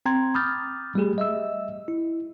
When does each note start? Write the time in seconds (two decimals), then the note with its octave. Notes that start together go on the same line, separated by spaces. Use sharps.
0.06 C4 G5 A#5 C6 G#6
0.34 B5 D6 D#6 F6 G6 A6
0.95 G3 A3 G4 G#4
1.18 D#5 E5 E6
1.88 E4